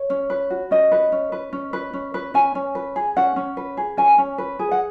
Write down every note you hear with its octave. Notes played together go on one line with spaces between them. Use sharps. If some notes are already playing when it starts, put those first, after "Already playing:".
Already playing: C#5
C#4
B4
F#4
C#4 D#5
B4
C#4
B4
C#4
B4
C#4
B4
C#4 G#5
C#4
B4
G#4
C#4 F#5
C#4
B4
G#4
C#4 G#5
C#4
B4
G#4
F#5